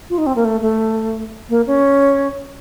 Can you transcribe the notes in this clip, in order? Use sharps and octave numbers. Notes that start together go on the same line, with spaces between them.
F4
D#4
C4
A#3
A3
A3
A#3
C#4